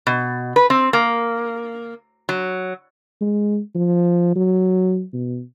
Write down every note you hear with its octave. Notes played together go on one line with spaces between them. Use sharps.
B2
B4
C4
A#3
F#3
G#3
F3
F#3
B2